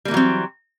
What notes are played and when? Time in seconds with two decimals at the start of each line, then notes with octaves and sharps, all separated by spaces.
0.05 G3
0.08 A#3
0.11 E3
0.14 F#3
0.17 C4